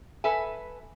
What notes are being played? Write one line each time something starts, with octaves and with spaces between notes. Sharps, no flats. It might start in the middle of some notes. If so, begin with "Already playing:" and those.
A4 B4 E5 G#5